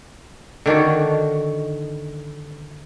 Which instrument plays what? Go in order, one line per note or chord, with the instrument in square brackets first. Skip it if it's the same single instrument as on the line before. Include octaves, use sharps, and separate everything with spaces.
[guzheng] D3 D#3 D4 F#4